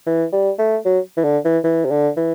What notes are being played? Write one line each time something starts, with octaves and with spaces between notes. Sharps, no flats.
E3
G3
A3
F#3
E3
D3
E3
E3
C3
D3
E3